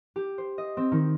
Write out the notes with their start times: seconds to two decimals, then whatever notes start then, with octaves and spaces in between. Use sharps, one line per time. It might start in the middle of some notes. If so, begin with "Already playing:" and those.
0.16 G4
0.38 C5
0.58 D#5
0.77 C4
0.92 D#3